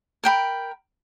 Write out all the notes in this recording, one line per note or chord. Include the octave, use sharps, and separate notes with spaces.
A#4 G5 B5